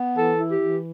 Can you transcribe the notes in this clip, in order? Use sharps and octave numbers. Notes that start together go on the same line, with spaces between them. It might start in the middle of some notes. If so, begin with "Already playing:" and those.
Already playing: B3
E3 A4
E4
G4
E3